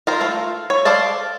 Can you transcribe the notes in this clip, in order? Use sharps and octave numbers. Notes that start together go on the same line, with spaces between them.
F4 A#4 C5
A3 F4
C#5
A4 C5 D5 F5 A5